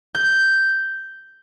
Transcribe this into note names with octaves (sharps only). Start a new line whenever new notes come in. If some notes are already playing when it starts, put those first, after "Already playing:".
G6